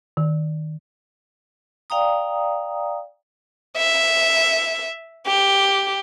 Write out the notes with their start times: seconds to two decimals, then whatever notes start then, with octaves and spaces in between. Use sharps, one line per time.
0.17 D#3
1.90 D5 F5 G5 A#5 D#6
3.77 E5
5.27 G4